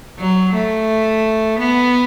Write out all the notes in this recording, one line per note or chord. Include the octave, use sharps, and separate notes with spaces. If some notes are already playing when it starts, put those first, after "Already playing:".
F#3
A3
B3